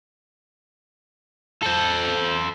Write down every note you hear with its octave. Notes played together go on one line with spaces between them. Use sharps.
A4 C5